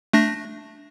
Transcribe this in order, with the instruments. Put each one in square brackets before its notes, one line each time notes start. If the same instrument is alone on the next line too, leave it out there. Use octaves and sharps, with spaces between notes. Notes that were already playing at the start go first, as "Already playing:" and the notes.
[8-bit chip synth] A3 D4 A#6